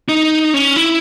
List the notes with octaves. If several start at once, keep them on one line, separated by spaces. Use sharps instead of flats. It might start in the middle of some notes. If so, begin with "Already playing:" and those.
D#4
C#4
E4